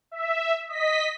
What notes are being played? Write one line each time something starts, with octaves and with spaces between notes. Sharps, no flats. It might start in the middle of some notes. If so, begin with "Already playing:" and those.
E5
D#5 B6